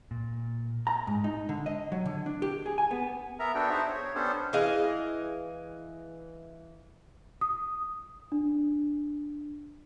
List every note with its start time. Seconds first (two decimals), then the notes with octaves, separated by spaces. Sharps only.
0.11 A#2
0.87 A#5
1.07 G#2
1.24 D#4
1.49 D3
1.66 D#5
1.92 F#3
2.06 D3
2.26 D4
2.42 G4
2.66 G#4
2.78 G#5
2.91 B3
3.39 B3 A#4 E5 A#5
3.55 B3 D4 F#4 A4 G5
3.70 D#4 F#4 G#4 C5 E5
3.88 C#5
4.15 B3 C#4 D4 G4 A4 C5
4.53 E3 G#4 D#5 F5
7.41 D#6
8.32 D4